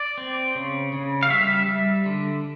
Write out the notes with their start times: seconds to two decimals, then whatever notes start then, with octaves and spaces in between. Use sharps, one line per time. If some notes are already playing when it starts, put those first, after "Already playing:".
Already playing: D5
0.18 C4
0.55 C#3
0.93 C#3
1.23 F5
1.30 G3 E5
1.68 G3
2.06 D3